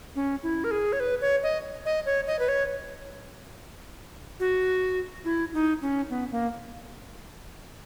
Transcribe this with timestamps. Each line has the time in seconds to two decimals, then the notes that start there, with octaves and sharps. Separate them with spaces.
0.16 C#4
0.43 E4
0.64 A#4
0.71 G#4
0.93 C#5
1.00 B4
1.21 C#5
1.43 D#5
1.85 D#5
2.06 C#5
2.27 D#5
2.39 B4
2.48 C#5
4.40 F#4
5.25 E4
5.54 D#4
5.82 C#4
6.10 B3
6.32 A#3